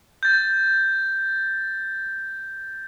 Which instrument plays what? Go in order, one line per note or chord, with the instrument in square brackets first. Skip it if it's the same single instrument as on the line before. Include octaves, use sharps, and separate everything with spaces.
[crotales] G6 A6